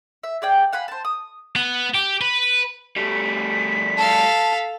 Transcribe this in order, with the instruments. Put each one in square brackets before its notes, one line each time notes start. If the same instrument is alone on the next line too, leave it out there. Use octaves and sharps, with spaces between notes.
[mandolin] E5
G#4 D5 G5
F5 F#5 G#5 B5
C5 A5
D#6
[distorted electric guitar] B3
G4
B4
[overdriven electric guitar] G3 A3 [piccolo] B6
[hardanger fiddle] A4 F5 [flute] A5